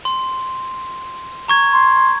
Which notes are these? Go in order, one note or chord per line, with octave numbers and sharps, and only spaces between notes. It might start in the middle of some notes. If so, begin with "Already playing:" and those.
C6
A#5 C#6 G#6
C6